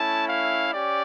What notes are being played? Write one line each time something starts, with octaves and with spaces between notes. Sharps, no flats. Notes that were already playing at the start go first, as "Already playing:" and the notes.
Already playing: A3 C#4 E4 A5
F5
C#4 G4 D5